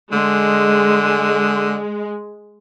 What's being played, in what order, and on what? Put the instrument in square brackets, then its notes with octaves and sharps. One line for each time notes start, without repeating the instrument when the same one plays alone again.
[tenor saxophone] D3 [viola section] G#3